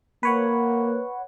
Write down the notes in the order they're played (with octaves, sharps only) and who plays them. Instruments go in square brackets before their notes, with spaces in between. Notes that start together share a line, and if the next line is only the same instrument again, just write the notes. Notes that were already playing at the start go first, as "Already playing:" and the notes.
[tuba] A#3 [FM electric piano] B4 C#5 F#5